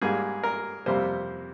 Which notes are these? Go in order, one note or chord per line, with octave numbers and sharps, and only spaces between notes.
G#2 G3 A#3 G#4
A#4
F2 C3 G3 A#3 C5